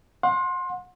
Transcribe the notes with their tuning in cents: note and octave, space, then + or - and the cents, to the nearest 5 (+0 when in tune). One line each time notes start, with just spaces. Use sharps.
F#5 -35 C6 +20